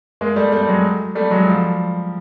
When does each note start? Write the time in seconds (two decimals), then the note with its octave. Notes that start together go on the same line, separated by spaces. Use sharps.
0.21 G#3 A#3
0.36 G3 A3
0.52 G3 A3
0.68 F#3 G#3
1.15 G3 A3
1.31 F#3 G#3
1.47 F3 G3